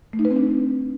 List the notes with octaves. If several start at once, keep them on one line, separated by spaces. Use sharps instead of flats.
A3
D#4
B4
C4
D4